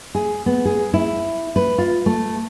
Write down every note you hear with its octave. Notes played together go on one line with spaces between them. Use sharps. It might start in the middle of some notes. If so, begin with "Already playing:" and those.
G#4
B3
G#4
E4
B4
F4
A3